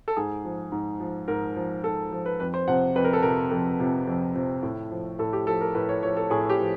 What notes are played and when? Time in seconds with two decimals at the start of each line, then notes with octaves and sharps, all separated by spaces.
0.08 A4
0.17 G#2 G#4
0.44 F3
0.72 G#2
1.00 F3
1.28 G#2 A#4
1.56 F3
1.84 G#2 A4
2.12 F3
2.26 B4
2.40 F2 B4
2.54 C5
2.68 C3 F3 F#5
2.96 F2 B4
3.04 A#4
3.13 A4
3.22 C3 F3 A#4
3.51 F2 A4
3.80 C3 F3
4.07 F2
4.35 C3 F3
4.63 A2
4.91 F3
5.19 A2 A4
5.33 G4
5.47 F3 A4
5.61 A#4
5.75 A2 B4
5.89 C#5
6.03 F3 C#5
6.17 A4
6.30 A2 G#4
6.50 G4
6.59 F3